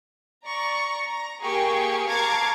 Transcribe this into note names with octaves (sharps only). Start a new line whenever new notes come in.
D5 A#5 C#6
A#5
A#3 G4 G#4 G5 C#6
F5 A5 A#5 C#6 D6 G#6